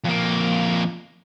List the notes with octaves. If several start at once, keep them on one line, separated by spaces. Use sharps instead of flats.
F2 A#3